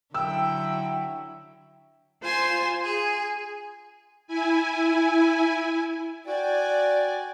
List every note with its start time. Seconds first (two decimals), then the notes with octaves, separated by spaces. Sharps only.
0.14 D3 F#3 E4 G5 E6
2.22 F4 C5 G#5 C6
2.85 G#4
4.27 E4 G#5
6.27 F#4 D5 G5 G#5